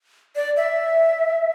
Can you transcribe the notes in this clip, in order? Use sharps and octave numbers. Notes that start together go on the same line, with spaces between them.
D5
E5